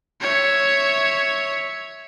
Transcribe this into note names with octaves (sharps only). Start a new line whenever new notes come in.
C#5 E5